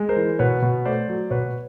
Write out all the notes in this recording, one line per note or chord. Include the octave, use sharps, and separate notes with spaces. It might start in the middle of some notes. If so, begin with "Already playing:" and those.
Already playing: G#3
A#4 C5
E3
B2 B4 C#5
B2
A3 C5 D5
F#3
B2 B4 C#5